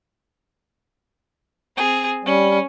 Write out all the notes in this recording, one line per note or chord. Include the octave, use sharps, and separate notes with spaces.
C4 G#4
G3 C#4